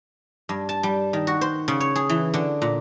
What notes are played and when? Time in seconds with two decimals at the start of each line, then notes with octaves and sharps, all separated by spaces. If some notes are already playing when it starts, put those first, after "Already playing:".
0.49 G2
0.69 A5
0.83 G3
1.13 D#3
1.27 F#4
1.41 C5
1.68 C#3
1.80 C#5
1.95 G#4
2.09 E3
2.34 D3
2.62 A#2